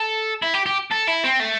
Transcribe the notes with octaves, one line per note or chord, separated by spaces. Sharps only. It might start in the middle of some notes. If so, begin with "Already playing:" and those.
Already playing: A4
E4
G4
G4
A4
E4
C4
A3